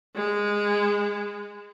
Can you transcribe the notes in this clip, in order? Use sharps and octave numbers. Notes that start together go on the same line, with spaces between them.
G#3